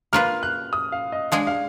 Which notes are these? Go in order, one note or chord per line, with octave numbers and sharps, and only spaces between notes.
A#3 F4 B4 F6
F#6
D#6
F5
D#5
G#3 D4 G#4 F5
F5